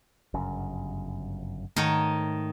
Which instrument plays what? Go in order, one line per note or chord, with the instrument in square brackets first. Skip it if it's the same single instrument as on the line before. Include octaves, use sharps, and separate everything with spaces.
[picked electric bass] G1 F#2 C#3
[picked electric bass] G#2 A3 [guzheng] D#3 D#4 C#5